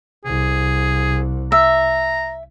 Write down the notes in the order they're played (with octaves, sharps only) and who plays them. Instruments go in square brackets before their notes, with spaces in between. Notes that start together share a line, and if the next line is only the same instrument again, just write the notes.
[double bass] C2 [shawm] G#4
[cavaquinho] E5 [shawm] A#5